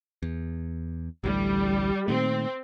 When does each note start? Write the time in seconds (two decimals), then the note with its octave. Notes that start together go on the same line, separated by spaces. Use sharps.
0.22 E2
1.24 A1 D2 A2 G3
2.08 A#2 D#3 A3 C4